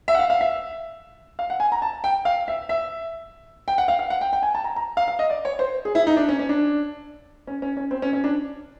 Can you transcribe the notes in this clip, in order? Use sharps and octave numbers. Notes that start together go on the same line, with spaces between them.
E5
F#5
F5
F5
E5
F5
F#5
G#5
A#5
A5
G5
F5
E5
E5
G5
F#5
F5
F5
F#5
G5
G5
G#5
A5
A#5
A#5
F5
F5
D#5
D5
C#5
C5
G#4
E4
D#4
D4
C#4
C#4
D4
C#4
C#4
C#4
C4
C#4
C#4
D4